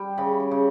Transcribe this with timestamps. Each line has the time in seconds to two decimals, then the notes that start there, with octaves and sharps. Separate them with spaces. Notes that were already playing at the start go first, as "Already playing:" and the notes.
Already playing: G3 G5
0.18 C#3 B5
0.40 D6
0.51 C#3